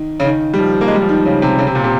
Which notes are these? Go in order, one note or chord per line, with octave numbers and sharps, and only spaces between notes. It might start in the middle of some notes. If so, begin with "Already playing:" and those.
Already playing: D#3
C#3
D#3
G3
F3
A#3
G#3
G3
F3
D#3
C#3
C3
C#3
C3
A#2
C3